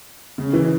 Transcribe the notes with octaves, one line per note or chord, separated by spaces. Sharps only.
C#3
E3